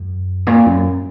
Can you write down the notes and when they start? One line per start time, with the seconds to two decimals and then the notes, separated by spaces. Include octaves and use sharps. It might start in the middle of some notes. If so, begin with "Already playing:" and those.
Already playing: F#2
0.47 A#2
0.66 F#2